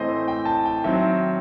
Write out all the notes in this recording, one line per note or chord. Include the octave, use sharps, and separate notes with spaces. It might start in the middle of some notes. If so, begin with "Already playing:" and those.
Already playing: A2 E3 A3 C4 C5 D#5
G5
A5
G5
D#3 F#3 C4 E5